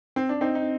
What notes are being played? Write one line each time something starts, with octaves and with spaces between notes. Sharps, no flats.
C4
D4
C4 D#4
D#4